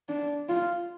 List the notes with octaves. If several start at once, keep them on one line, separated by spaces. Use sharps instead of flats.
D4
F4